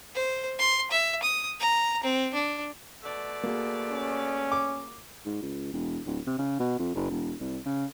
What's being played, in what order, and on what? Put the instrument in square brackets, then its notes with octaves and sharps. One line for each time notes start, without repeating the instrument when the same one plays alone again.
[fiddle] C5
C6
E5
D#6
A#5
C4
D4
[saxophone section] B2 A3 D5
[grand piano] A#3 F#4 G#4
[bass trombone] C#4
[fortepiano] D6
[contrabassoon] G#2
C#2
E1
D1
C3
C#3
B2
F2
F#1
E1
C2
C#3